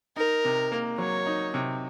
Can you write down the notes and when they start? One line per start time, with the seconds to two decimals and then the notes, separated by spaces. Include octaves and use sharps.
0.16 D#4 A#4
0.45 C3
0.72 A#3
0.98 F#3 C#5
1.26 D#4
1.54 C3